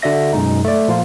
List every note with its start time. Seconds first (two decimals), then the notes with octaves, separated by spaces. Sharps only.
0.02 D3 F#4 D5 E5 A#6
0.33 F#2 B2 G#3 D#4
0.65 A3 D5
0.88 A#2 F3 A#3 F4